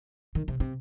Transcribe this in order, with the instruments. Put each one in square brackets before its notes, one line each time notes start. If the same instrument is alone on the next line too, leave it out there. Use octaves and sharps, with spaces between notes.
[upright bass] D#3
C3
C3